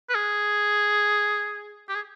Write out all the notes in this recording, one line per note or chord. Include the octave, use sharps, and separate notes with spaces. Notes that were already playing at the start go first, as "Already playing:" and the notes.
B4
G#4
G4
G#4